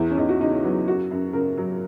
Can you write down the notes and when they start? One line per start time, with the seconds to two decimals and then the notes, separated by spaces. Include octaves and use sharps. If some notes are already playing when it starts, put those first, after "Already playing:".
Already playing: E2 E4
0.11 C#4
0.18 E2 D#4
0.29 F#4
0.41 C#3 D#4
0.52 C#4
0.64 F#3 B3
0.87 F#2 F#4
1.11 F#2
1.33 C#3 A#4
1.58 F#3